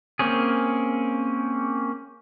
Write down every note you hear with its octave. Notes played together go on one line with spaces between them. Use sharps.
A#3 C4 C#4 G#4